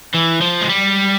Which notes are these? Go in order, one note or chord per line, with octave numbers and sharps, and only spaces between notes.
E3
F3
G#3
G3